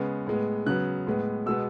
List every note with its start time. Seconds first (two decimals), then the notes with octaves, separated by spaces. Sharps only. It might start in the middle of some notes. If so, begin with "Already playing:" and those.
Already playing: C#3 G#3 B3
0.27 A2 G#3 B3
0.66 C#3 F#3 B3 F#6
1.07 A2 G#3 B3
1.46 B2 G#3 B3 E6